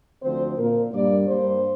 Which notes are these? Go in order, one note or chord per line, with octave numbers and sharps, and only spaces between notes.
D2 D3 F3 C4 C5
A#2 A#3 A#4
G2 G3 A#3 D5
G2 G3 A#3 C5